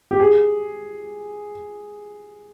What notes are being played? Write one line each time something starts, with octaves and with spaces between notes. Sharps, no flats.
G4
G#4